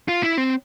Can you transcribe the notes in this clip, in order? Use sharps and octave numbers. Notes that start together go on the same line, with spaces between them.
F4
E4
C4